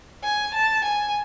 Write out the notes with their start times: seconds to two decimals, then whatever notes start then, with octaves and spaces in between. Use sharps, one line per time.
0.24 G#5
0.54 A5
0.85 G#5